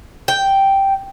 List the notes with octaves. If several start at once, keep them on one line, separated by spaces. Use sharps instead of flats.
G5